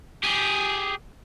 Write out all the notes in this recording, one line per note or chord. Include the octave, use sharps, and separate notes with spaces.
G4 G#4